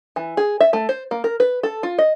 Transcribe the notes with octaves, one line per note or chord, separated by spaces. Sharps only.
E3
G#4
E5
A3
C5
A#3
A#4
B4
A4
F4
D#5